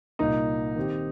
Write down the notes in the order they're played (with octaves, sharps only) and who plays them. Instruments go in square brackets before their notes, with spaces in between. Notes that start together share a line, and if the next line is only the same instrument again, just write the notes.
[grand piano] C2 A#2 A#3 [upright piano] D#4
[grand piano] D#3 C4 G4